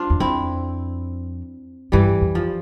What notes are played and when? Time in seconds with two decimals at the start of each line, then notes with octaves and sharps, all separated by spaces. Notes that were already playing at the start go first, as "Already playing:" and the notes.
Already playing: D4 F4 C5
0.10 E2
0.20 F2 C4 E4
1.92 G2 E3 G3
2.21 F2
2.35 F3